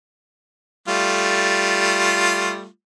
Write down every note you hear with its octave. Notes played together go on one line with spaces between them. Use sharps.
G3 A3 F4